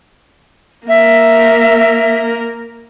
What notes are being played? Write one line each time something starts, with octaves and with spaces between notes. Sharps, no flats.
A#3 A#4 E5